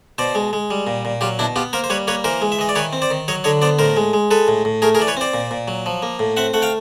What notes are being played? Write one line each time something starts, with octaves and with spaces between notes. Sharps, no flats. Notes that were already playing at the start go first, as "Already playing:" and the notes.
B2 C5 D5
G#3
G#3
G3
A#2
A#2
F#3 F4 G4
B2 D4 E4
B3 F4 G4
A#3 A#4 C5
C5
G3 B4 C#5
A#3 B4 C#5
E3 A#4 C5
G#3
E5
E3 D#5
D5
D#3 B4 C#5
C4
C5 D5
D#3
F#3 C#5 D#5
D3 C#5 D#5
B3 C5 D5
A2 A#4 C5
G#3
G#3
G#3 A4 B4
A2
A2
A3 G#4 A#4
G#4 A#4
E3 D5
B4 C#5
C4 C5 D5
A#2
A#2
F#3
F3
A#3
A2
C4 E5 F#5
A3 F#5
F5 G5